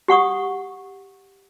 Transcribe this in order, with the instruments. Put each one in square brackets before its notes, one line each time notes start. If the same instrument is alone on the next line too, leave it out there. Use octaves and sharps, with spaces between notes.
[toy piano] G4 F#5 C#6 D#6